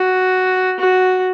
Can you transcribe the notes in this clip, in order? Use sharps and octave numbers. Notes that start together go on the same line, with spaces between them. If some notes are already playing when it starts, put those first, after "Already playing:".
Already playing: F#4
F#4